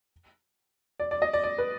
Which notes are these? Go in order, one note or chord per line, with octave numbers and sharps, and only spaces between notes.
D5
D5
D#5
D5
D5
B4